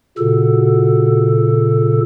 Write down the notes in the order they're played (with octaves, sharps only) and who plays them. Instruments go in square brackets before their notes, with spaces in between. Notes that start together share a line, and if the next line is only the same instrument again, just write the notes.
[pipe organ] A#2 C#3 A4 [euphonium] F#4